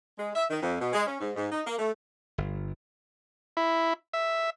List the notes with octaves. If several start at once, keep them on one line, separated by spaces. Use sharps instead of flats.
G#3
E5
D#3
F2
B2
G#3
C#4
G#2
G#2
D#4
A#3
A3
G1
E4
E5